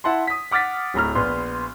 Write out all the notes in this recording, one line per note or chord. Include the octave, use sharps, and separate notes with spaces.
E4 F#5 A5 C6
D#6 B6
F#5 D6 F6 A6 B6
D1 A2 A#5 F6
A#1 B3 C6